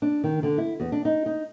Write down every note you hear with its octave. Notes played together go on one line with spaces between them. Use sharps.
D4
D#3
D3
E4
E2
D4
D#4
D#4